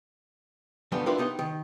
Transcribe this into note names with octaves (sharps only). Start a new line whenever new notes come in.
D3 F3 G3 A3 B3
D4 E4 F4 G4 A#4 B4
B3 D#4 G4
D#3